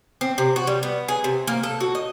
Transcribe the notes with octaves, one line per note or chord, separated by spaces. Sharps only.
C4
C3
F#4
G3
B3
G#4
C3
A#3
A4
F#4
D#5